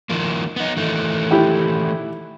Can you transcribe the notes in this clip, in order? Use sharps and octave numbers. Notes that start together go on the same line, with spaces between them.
D#3 F3 A#3
B3 D#4
D#3 E3 A3
E4 G4 G5